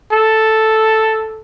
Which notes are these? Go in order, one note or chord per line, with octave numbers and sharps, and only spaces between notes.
A4